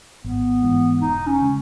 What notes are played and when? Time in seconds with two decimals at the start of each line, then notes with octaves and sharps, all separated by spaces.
0.24 G#1 B3
0.63 G#2 E3
1.01 E1 D#4
1.27 C#4
1.41 C#3 G#3